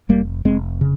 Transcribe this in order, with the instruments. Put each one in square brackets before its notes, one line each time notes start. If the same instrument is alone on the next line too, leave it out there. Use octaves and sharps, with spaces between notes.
[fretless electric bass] F1 G3 A#3
F1 G#3 C4
C#3